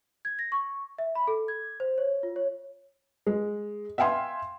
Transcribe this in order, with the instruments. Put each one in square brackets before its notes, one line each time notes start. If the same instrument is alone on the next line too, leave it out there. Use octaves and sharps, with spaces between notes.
[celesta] G#6
A#6
C#6
E5
B5
A4
G#6
C5
C#5
F4
C#5
[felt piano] G#3
E5 F5 G5 G#5 C6